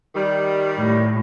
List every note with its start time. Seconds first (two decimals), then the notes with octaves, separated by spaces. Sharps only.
0.15 D#3 G3
0.79 A2